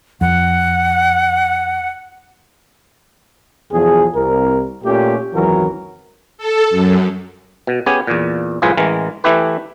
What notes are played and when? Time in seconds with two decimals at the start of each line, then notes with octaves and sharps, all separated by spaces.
0.21 F2 F#5
3.72 B1 E2 F3 G#4
4.15 C2 A#4
4.84 A#2 A3 C#4 G4
5.34 G#1 C#2 F#2 E3 F#3 A#4
6.38 A4
6.70 F#2
7.67 B2
7.86 B3 C#4 G4 G#4 G#5
8.07 E2 A#2
8.62 C2 F2 A2 F4 G#4 B4
8.77 A1 E3 G#3 A#4
9.24 E3 A3 E4 G4 B4